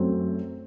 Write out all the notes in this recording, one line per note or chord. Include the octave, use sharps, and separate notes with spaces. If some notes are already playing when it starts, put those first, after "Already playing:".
Already playing: F#2 F#3 A3 C4